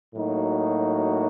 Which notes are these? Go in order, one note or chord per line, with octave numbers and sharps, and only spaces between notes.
A2 F#3 A#3 D#4 F#4